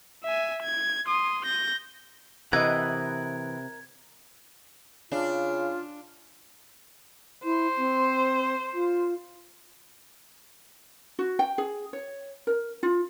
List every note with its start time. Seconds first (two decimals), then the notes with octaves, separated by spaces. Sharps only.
0.24 E5 G#5
0.62 G#6
1.07 C6 D#6
1.45 G6 A#6
2.53 C3 E3 A#4 B4 D#5 F#5 G#6
5.12 C#3 D4 F4
7.44 E4 C5
7.78 C4
8.74 F4
11.19 F#4
11.39 G5
11.58 G#4
11.93 C#5
12.47 A#4
12.83 F4